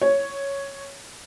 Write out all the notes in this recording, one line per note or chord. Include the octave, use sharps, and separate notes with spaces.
C#5